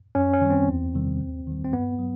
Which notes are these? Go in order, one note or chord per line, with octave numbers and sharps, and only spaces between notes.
F#2 C#4
C#4
D#3 G3
C4
E2
C3 D#3 G3
D#2
D#3 G3
C4
G2 B3
F#3